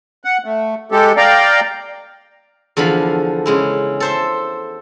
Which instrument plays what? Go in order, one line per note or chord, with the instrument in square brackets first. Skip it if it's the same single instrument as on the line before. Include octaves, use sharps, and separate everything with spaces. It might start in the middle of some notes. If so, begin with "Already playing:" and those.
[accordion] F#5
A3
G#3 G4 A4
D5 F5 G5 A#5
[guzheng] E2 D3 F3 F5 B5
C#3 G#3 E4
A4 C5 E5